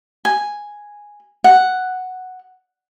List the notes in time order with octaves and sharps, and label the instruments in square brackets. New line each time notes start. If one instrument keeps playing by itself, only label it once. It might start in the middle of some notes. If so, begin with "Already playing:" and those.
[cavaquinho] G#5
F#5